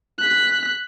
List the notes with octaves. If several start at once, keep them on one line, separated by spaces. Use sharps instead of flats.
F#6 B6